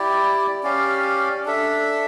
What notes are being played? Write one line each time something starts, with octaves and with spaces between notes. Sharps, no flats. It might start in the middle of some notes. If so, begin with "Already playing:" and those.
Already playing: E4 G4 D5
C#4 G4 D5 F5
D4 A4 E5